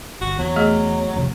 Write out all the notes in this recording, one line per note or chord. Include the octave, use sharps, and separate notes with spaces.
G1 F#4
E2 F#3
A3 G#4 D#5
G#1 F2 C3